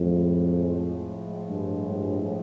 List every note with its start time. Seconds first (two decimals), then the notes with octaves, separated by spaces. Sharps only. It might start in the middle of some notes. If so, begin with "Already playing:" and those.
Already playing: F2 A2 F3 G#3
1.48 G2
1.89 G2